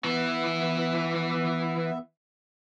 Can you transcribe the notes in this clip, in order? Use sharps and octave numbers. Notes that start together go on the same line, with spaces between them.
E3 B3 E4 E5